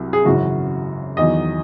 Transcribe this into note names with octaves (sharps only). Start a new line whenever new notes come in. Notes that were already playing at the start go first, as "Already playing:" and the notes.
Already playing: C2 C3 F#3
G#4
G#1 F#2 C#3 E3 F#4
E2 D#3 F#3 D#5